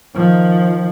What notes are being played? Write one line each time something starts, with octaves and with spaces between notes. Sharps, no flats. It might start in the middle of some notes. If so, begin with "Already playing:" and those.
D#3 F3